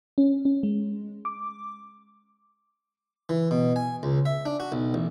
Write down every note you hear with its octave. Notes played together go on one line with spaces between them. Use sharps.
C#4
C#4
G#3
D6
E3
B2
G#5
C#2
E5
D4
F#4
B1
A1